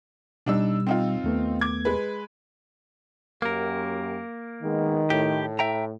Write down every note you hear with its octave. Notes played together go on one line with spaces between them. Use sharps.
B2 G3 D4 D#4 E6
C4 D#4 F4
D#2 A3 B3
D6 G#6
G#3 B4
F#2 A#3 G4 A#4
D#3 G#3 B3
A2 G4
E5 G5 A#5